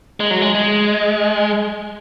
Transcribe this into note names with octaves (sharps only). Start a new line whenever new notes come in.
G#3
F#3
G#3
G#3